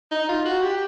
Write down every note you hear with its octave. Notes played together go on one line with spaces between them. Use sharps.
D#4
F4
F#4
G4